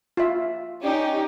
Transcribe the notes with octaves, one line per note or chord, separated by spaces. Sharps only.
F4 E5
C#4 D#4 G4